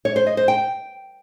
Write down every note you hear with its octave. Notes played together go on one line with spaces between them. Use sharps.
C#5
C5
D#5
C5
G5